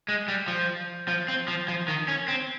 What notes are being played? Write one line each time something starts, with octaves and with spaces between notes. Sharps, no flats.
G#3
G3
F3
F3
C4
F3
F3
D#3
C#4
C4